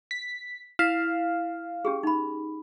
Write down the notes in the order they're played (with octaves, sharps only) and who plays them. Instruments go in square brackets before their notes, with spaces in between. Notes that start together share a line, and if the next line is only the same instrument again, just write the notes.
[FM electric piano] B6
[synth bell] E4 [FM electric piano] F5
[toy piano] C#4 G4 G#4
D#4 B5